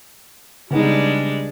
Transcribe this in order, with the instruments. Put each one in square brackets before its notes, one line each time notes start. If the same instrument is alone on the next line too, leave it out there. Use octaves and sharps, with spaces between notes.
[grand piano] C#3 B3 D#4 [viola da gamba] G3 G#3 D4